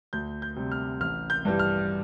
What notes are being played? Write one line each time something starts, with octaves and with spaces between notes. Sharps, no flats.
D2 G6
G6
C3 G3
F6
A1 F6
G6
G2 E3 G3
F6